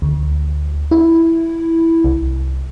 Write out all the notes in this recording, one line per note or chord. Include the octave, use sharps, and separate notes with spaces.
D2
E4
C2